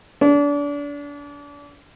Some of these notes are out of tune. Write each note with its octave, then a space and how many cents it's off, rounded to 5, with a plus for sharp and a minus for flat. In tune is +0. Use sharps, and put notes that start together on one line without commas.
D4 -30